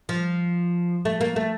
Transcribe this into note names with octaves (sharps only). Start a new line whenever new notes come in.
F3
A3
A#3
A3